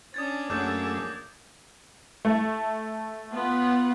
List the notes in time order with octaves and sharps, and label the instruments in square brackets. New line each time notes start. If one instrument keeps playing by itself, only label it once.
[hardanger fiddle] C#4 D4 [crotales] D#6 G#6 A6
[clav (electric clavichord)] F#2 F#3 [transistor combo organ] A3 G#4 E6 [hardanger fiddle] A#3 [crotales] D6 G6
[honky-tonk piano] A3
[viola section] B3 F4 F#5